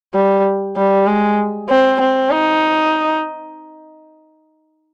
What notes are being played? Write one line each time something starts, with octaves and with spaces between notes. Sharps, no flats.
G3
G3
G#3
C4
C4
D#4